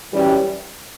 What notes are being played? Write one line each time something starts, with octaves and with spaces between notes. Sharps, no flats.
F#2 E3 G3 C#4 G4